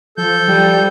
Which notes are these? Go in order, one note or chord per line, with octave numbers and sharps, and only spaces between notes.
F3 A4 G6
F3 G3